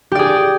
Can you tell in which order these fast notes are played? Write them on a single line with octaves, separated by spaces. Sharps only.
G4 D5 G#4